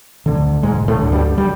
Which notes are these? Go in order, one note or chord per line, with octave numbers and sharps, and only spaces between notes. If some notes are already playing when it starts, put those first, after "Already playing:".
D2 D3
E1 G#2 G#3
A2 A3
D2 D3
G2 G3
G3